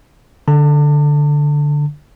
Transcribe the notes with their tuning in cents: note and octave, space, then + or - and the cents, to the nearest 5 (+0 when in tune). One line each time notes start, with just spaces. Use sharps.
D3 +0 A5 +35